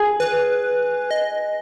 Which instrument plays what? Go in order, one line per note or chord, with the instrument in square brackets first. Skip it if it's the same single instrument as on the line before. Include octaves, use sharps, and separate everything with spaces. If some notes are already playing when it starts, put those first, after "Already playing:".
Already playing: [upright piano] G#4
[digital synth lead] B4
D#5